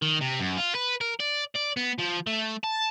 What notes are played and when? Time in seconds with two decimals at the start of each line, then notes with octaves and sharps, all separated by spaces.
0.02 D#3
0.21 C3
0.40 F#2
0.57 F4
0.75 B4
1.01 A#4
1.20 D5
1.55 D5
1.77 B3
1.99 F3
2.27 A3
2.63 A5